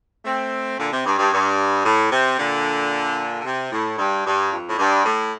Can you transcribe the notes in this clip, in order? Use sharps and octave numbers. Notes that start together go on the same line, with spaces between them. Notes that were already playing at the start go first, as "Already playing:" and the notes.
A3 C4
A#2 D3
C3
G2
G2
G2
A2
C3
A#2 D3
D3
C3
A2
G2
G2
F2
A2
G2
A2